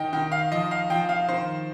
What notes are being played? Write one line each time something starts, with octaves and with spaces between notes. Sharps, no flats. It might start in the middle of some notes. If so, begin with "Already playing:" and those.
Already playing: D#3 D#5 G5
D#3 G5
F5
F3 D#5
F5
F3 G5
F5
D#3 C5